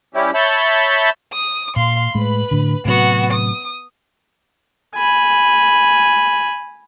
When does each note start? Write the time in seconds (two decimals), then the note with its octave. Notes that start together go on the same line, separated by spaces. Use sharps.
0.14 G3 C#4 E4 G4
0.34 C#5 E5 A5 B5 G6
1.33 D#6
1.76 A#2 F5 C6
2.15 A2 G#3 B4 B5
2.51 A2 D3
2.85 A2 C3 F#3 B3 F#4
3.33 D#6
4.96 G#5 B5